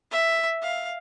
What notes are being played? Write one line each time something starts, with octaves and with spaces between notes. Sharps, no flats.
E5
F5